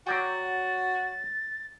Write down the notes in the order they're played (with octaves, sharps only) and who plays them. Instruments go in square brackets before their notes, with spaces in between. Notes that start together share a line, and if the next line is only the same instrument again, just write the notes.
[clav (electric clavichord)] F#3 D5 G5 [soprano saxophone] F#4 [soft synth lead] A6